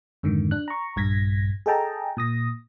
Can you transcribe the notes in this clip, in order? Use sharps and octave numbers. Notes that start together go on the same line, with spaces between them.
F2 G#2 D3 D#3
D4 F#6
A#5 C#6
A#1 G2 G#6 A#6 B6
G#4 A4 D#5 G5 A5 A#5
A#2 D#6 A#6